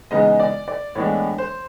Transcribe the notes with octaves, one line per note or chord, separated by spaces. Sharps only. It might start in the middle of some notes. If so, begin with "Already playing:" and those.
C#3 E3 G#3 B3 D#4 D#5
D5
D5
A2 E3 G#3 B3 D4 C#5
C5